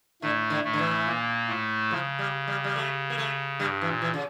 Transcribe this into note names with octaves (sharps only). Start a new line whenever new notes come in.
A2 D3 A3
D3
A2 A3
D3
E3
A#2 A#3
A2 A3
C#3 F3
G3
G3
G3
A3
A#3
A3
G2 G3
E3
A#2
E3
C#3